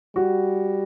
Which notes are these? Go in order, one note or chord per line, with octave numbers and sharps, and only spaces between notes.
G3 F#4